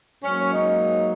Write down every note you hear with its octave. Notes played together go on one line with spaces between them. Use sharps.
G#2 F#3 A#3 C#4
D#4